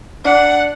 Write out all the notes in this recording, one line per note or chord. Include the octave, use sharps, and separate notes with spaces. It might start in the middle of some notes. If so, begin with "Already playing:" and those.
D4 F#5